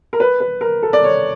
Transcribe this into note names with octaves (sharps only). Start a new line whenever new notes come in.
A#4
B4
B4
A#4
A4
D5
C#5